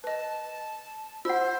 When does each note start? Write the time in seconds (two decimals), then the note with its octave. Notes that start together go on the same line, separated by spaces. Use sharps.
0.04 B4 D#5 A5
1.25 F4 C5 F#5 E6